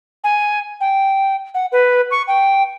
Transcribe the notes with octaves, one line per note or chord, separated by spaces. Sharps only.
G#5
G5
F#5
B4
C#6
G5